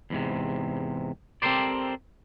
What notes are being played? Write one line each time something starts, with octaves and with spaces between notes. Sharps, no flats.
E2 G#2 C3
C4 G4 A4 A#4 C5 D5